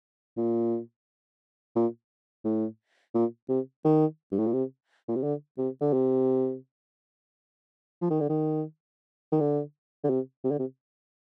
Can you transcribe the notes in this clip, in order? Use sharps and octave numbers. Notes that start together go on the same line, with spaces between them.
A#2
A#2
A2
A#2
C3
D#3
G2
A2
A#2
C3
A#2
C3
D3
C3
D3
C3
F3
D#3
D3
D#3
D#3
D3
D3
C3
C3
D3
C3